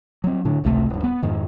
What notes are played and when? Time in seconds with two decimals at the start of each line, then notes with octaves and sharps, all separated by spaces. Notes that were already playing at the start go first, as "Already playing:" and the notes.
0.24 F#3 C4
0.45 A2 D3 D4
0.64 G#1 C#2 C3 A3
0.90 D1 G2
1.04 B3
1.23 F2 G#2 D#3